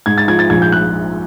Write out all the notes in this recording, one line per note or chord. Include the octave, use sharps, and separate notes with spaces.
G#2 G#6
A6
F3 G#6
A6
A#1 G#6
G6
F#6